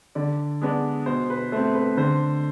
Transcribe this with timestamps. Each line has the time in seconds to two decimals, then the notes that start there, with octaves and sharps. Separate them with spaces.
0.15 D3 D5
0.62 G#3 B3 D4
1.06 B2 C5
1.30 B4
1.52 A3 C4 C5
1.75 B4
1.97 D3 C5